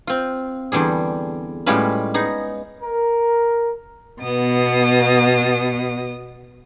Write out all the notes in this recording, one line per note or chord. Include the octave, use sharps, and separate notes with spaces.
C4 F4
E2 D3 G3 G#4
A2 G3 G#3 C#4 F4 B4
B3 D#4 G#4
A#4
B2 B3 D#6